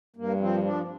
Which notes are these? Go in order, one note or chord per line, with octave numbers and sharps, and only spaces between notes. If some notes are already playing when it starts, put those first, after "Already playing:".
G2 A#3
F3 C4
F3 D4